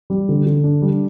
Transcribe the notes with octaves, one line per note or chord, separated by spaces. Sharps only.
G3
D3
D3
D4
G3